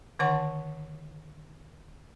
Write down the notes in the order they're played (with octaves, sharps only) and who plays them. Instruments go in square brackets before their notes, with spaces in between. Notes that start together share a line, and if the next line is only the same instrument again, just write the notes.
[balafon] D3 D#3 C#5 F#5 A5 C#6